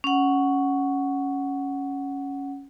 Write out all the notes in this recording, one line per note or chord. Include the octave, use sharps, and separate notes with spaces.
C#4 F#5